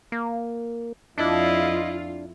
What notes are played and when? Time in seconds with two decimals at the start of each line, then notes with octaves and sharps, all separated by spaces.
0.12 A#3
1.18 F2 D4 E4 F4 D#5